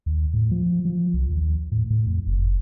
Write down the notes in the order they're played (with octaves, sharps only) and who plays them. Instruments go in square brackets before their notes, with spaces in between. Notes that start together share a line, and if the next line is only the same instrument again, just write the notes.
[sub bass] D#2
A2
F3
F3
C2
D#2
A2
A2
F2
F#1